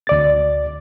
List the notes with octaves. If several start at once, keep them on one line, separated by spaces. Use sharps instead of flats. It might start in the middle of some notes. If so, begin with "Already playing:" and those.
D2 D5 A6